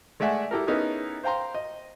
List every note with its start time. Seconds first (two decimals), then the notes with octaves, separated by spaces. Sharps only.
0.20 G#3 A3 D5 E5 F#5 G#5
0.51 E4 G4 A4 A#4
0.67 B3 C#4 D#4 E4 G#4 A#4
1.24 C5 F5 G5 A#5 C6
1.55 D#5